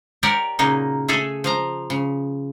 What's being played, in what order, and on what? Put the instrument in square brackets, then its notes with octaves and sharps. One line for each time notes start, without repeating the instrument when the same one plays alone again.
[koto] G4 A#4 C#5 D5 F#5
A#2 C#3 F#3 A#3 D#4
A3 G#4 A4 E5 G#5
F3 F5 A#5
C#3